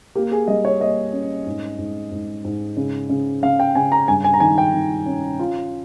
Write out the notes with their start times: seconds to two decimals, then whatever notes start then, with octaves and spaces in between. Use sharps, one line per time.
0.15 A#3 G4
0.31 G#4
0.48 G3 D#5
0.65 C#5
0.80 A#3 D#5
1.13 C#4
1.46 G#2
1.78 G#2
2.12 G#2
2.45 G#2
2.77 C#3
3.10 C#3
3.42 C#3 F5
3.60 G5
3.75 C#3 G#5
3.92 A#5
4.08 G2 G#5
4.24 G#5
4.34 A#5
4.40 D#3 G#5
4.58 G5
4.74 D#3
5.06 C#4
5.39 F4